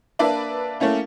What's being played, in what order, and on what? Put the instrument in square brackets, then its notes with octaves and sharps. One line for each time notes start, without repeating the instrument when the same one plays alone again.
[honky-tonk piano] A#3 D4 B4 D5 E5
A3 A#3 C#4 E4